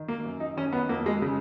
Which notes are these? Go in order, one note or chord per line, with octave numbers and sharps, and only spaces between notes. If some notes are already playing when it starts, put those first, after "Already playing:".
Already playing: D#3
A#3
F#2
D#4
D#3 C#4
B3
F2 A#3
G#3
C#3 G#3